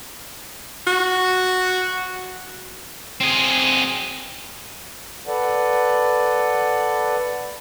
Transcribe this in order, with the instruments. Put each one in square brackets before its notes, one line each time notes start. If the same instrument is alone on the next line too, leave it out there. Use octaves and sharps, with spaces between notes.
[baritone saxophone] F#4
[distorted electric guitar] C4 G#4
[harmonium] A4 B4 D5 F#5